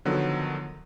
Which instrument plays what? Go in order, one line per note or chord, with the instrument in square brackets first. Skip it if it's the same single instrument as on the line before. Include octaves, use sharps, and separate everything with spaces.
[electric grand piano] D3 D#3 F3 F#3 B3